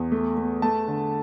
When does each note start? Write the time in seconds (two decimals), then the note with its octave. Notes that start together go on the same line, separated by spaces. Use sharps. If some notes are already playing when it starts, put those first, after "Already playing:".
Already playing: E2
0.12 A3
0.37 A3
0.62 A3 A5
0.88 D3